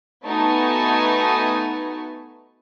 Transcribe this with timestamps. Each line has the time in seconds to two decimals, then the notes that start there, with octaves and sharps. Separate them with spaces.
0.24 A3 B3 D#4 F#4 G#5 A5